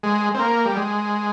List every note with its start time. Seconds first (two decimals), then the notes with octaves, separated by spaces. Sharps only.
0.03 G#3
0.35 C4
0.39 A#3
0.65 G3
0.77 G#3